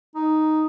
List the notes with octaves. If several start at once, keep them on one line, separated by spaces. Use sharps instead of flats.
D#4